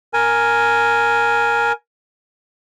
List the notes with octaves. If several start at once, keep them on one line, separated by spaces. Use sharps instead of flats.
A#4 G#5